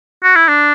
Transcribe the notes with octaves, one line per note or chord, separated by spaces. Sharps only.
F#4
E4
D4